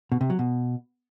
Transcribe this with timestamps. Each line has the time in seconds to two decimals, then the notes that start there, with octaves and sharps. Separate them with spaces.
0.12 B2
0.21 C3
0.30 F#3
0.39 B2